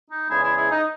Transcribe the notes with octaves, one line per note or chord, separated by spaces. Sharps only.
D#4
E2 C#3 G#3 E4 G#4
E4 G#4
E4 G#4
D#4